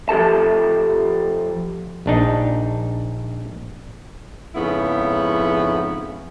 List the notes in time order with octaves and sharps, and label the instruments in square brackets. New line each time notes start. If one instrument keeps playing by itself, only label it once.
[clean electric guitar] F3 G4 A4 A5
[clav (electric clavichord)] A#1 D4 D#4
[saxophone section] F2 G#2 C#3 B3 E4